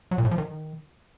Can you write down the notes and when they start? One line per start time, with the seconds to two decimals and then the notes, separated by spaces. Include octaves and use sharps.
0.11 F#3
0.18 A#2
0.25 A2
0.31 F3
0.38 D#3